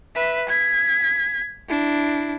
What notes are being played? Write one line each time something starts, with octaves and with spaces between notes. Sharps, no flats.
B4 E5
G#6 B6
D4 E4